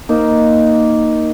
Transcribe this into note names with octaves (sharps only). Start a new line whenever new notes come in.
A#3 D#4